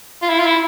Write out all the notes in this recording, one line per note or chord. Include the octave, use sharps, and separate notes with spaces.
F4
E4
F4
E4